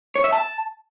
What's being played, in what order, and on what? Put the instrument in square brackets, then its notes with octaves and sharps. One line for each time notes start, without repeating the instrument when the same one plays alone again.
[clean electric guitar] C#5
E5
A5